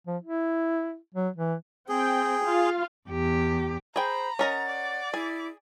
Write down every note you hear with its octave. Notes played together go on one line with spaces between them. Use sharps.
F3
E4
F#3
E3
C4 G#4 G5
F4 F5
E2 G4
G#4 C5 G5 A#5 B5
C#4 A#4 D#5 F#5 A6
D5
E4 G#4